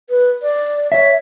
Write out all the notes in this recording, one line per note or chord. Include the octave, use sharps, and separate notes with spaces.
B4
D5
C#5 E5